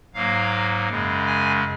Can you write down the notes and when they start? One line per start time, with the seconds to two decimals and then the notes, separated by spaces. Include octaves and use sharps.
0.14 G#2 F#3 A#3 F5
0.88 F#2 C#3 G#3
1.26 G#5